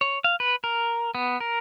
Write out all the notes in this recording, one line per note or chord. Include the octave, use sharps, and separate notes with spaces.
C#5
F5
B4
A#4
B3
A#4